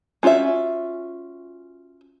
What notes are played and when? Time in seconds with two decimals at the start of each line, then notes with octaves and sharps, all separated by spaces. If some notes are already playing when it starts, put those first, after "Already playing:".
0.23 C#4 F4 F#4 C5 E5